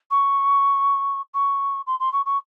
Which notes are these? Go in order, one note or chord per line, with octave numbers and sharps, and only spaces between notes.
C#6
C#6
C6
C6
C#6
C#6